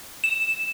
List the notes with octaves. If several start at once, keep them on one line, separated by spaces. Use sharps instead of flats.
E7